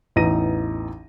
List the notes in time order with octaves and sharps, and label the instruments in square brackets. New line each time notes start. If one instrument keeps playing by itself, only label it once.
[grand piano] A1 E2 D#4 A#5 A#6 D#7